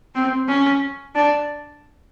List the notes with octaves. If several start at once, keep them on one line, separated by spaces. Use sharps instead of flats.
C4
C#4
D4